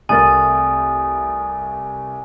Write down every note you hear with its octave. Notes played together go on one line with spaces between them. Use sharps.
C2 A3 A#4 G#5 D#6 A6